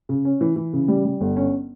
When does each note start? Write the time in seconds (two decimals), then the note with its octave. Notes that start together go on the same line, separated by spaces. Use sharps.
0.09 C#3
0.25 C#4
0.41 E3
0.56 E3
0.73 C#3
0.88 G3
1.05 G3
1.21 G1
1.36 C#4